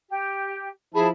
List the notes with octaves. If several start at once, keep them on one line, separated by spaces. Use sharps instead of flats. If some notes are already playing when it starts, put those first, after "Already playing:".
G4
F3 E4 G#4 A5 B5